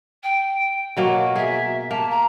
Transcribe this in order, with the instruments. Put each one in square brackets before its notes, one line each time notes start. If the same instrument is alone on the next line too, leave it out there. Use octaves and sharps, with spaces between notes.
[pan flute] G5
[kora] B2 F#3 A#3 [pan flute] F#4
[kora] G#4 [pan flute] E5
[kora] A#3 [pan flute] A5
[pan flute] A#5